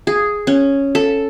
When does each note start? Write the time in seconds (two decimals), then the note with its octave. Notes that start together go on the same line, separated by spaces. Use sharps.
0.07 G#4
0.47 C#4
0.95 A4